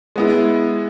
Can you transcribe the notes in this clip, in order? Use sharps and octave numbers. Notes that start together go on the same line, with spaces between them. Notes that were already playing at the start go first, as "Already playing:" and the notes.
G#3 B3 E4